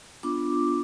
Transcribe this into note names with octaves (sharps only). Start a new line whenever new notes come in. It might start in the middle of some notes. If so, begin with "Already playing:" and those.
B3 D4 F4 D6